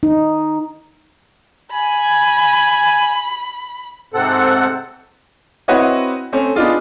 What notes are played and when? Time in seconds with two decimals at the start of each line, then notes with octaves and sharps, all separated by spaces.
0.03 D#4
1.72 G#5 B5
4.14 G#2 C3 C4 A4 F#5
5.68 C4 E4 F#4 B4 C#5 D#5
6.32 A3 C4 C#4
6.55 B3 D4 D#4 F4 G#4